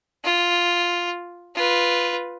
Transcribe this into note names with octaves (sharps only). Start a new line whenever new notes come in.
F4
F4 B4